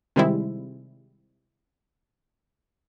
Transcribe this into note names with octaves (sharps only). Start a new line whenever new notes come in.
C3 D#3 G3 G#3 C4 E4